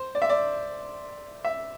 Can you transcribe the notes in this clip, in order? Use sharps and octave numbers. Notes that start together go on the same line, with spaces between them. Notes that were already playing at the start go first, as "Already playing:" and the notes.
Already playing: C5
D5
E5
D5
E5